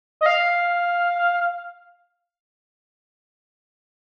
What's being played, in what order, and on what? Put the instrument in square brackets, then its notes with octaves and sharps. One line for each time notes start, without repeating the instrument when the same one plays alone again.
[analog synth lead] D#5
F5